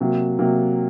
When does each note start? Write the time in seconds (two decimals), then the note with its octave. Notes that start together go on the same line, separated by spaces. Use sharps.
0.01 C3 F#3 A#3
0.39 C3 F#3 A#3